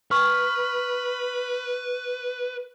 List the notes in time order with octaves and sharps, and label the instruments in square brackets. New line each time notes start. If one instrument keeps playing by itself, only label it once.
[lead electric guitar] B4 [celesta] C#6 F6